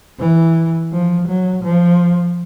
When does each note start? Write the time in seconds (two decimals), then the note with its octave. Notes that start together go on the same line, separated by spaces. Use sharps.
0.19 E3
0.92 F3
1.28 F#3
1.64 F3